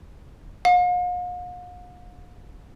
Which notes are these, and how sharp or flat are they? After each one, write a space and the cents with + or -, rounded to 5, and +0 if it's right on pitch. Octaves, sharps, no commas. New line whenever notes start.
F5 +45